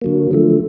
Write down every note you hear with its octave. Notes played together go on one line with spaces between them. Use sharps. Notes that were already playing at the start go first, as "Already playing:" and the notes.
D3 F#3 A#3
D3 F3 A3